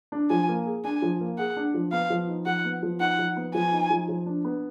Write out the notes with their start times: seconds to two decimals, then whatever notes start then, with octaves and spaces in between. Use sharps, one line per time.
0.12 D4
0.30 F3 G#5
0.48 A#3
0.66 G#4
0.84 D4 G#5
1.02 F3
1.20 A#3
1.38 G#4 F#5
1.57 D4
1.74 F3
1.92 B3 F5
2.10 F3
2.28 D#4
2.46 F3 F#5
2.65 B3
2.83 F3
3.00 D#4 F#5
3.19 F3
3.36 B3
3.55 F3 G#5
3.73 D#4
3.90 F3
4.09 F3
4.26 D4
4.45 B3